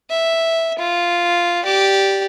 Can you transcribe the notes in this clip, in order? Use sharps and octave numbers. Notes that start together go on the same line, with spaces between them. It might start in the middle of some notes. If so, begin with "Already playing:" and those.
E5
F4
G4 D5